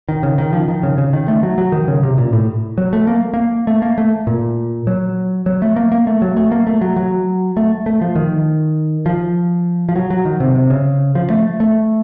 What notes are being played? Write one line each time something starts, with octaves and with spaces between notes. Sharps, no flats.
D#3
C#3
D#3
F3
D#3
C#3
C#3
D#3
A3
F#3
F#3
D#3
C#3
C3
A#2
A2
F#3
A3
A#3
A#3
A3
A#3
A3
A#2
F#3
F#3
A3
A#3
A#3
A3
F#3
A3
A#3
A3
F#3
F#3
A3
A3
F3
D#3
F3
F3
F#3
F#3
D#3
C3
C3
C#3
F3
A3
A3